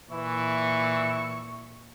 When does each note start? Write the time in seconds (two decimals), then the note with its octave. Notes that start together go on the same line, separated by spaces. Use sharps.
0.11 A#2 E3 E4 C#6